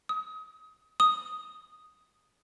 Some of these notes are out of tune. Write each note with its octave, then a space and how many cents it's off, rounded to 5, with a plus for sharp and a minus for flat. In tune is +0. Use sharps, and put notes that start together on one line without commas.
D#6 +30
D#6 +0